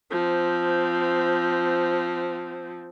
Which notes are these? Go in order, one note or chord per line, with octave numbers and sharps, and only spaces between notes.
F3 C4